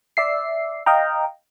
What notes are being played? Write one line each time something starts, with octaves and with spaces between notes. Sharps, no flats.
D5 E5 C7
D#5 F5 G5 A#5